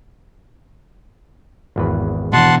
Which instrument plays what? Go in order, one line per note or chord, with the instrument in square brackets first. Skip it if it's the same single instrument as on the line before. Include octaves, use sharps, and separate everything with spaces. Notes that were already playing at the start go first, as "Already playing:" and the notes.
[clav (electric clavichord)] G#1 E2 B4
[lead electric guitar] B2 E3 [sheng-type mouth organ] F#5 A5 C6